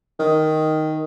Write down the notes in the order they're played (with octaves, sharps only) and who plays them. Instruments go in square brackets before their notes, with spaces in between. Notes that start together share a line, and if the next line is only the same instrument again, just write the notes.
[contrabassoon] D#3